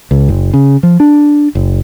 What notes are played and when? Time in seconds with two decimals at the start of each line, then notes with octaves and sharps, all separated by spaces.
0.11 C#2
0.29 F#1
0.54 C#3
0.83 F3
1.00 D4
1.55 F#1